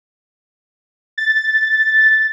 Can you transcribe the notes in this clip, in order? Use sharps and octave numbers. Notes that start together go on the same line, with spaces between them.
A6